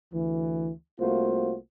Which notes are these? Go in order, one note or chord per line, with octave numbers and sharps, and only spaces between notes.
D2 E3
C2 A3 A#3 F4 F#4 C5